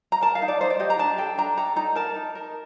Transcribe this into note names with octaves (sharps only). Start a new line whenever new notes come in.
A#5
A#4 A5
F5
D#4
D5
D#4 C5
D5
G4 D#5
A#5
D4 A5
A4 G5
D4 A#5
A4 A#5
D#4 A#5
A#4 A5
D#4
A#4